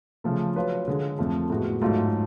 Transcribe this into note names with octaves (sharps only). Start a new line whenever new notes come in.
C#3 F3 A3
F#3 C#4 F4 B4
D3 G#3 C#4 G#4
F2 F3 A3
A2 G#3 B3 F#4
G#2 F#3 A3 F4